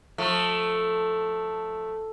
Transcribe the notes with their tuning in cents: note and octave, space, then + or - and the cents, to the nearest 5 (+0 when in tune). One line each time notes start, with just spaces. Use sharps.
F3 +25 A3 +0